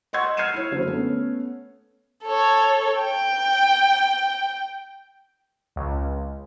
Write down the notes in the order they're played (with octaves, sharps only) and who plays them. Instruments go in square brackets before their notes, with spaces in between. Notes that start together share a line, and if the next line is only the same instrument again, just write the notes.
[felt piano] D#5 F#5 C6 C#6 E6 G#6
F6 G#6 C7 C#7 D#7 E7
E4 C#5
F#1 D3 F#4 C5
A3 B3 C#4
[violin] A4 C#5
G5
[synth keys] C#2